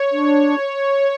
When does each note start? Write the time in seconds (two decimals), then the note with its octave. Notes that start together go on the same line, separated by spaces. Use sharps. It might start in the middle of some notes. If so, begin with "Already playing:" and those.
Already playing: C#5
0.12 D4
0.58 C#5